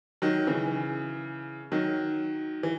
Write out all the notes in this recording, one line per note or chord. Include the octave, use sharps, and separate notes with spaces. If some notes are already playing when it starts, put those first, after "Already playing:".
D#3 F#3
C#3 E3
D#3 F#3
E3